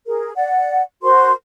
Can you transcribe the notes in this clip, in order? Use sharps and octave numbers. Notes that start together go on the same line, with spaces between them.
G#4 A#4
D5 F#5
F#4 A#4 C5 C6